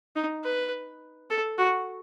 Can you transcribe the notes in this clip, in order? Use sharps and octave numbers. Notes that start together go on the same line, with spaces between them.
D#4
B4
A4
F#4